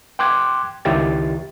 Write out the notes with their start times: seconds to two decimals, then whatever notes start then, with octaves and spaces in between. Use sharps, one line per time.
0.19 G5 C6 D6 F#6 G#6
0.85 C#2 D#3 E4 G4 A6